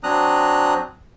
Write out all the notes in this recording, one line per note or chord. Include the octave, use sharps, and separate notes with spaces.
F#3 C4 D4 A#5 D#6 F#6